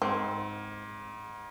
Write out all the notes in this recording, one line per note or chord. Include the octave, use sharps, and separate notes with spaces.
G#2 C4